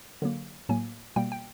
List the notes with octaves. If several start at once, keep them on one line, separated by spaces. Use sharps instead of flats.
D3 F#3 A#3
A2 F#3 A#3 G#5
B2 G3 A#3 G5
G5